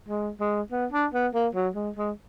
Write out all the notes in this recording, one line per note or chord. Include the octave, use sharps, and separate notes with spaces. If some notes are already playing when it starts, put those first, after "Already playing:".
G#3
G#3
B3
D4
B3
A#3
F#3
G#3
G#3